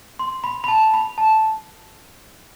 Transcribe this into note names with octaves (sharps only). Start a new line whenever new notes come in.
C6
B5
B5
A5
B5
A5